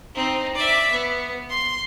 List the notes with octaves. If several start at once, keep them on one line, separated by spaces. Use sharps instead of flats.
C4 D#4
D5 E5
B3
C6